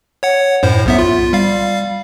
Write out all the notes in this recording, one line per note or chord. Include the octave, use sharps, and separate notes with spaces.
C#5 F#5
F#2 A2 C5
B1 B3 E5
F4
G3 F5